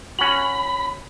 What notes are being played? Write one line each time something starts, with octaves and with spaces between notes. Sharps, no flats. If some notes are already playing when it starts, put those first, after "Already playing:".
C#4 F#4 B5